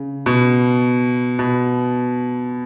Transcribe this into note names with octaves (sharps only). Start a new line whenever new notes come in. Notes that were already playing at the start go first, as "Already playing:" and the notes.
Already playing: C#3
B2
B2